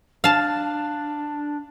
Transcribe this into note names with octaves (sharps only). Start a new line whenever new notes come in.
D4 F5 A5